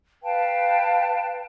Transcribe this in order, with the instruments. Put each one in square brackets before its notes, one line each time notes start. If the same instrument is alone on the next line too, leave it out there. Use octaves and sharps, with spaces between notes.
[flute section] B4 F5 G5 A5